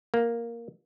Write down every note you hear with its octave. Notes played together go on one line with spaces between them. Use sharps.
A#3